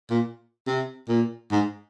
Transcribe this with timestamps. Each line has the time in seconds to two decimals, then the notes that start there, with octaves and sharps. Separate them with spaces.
0.10 A#2
0.67 C3
1.08 A#2
1.51 G#2